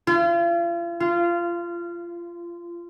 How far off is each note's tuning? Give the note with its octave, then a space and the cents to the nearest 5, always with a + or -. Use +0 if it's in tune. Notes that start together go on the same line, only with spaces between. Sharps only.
F4 -40
F4 -20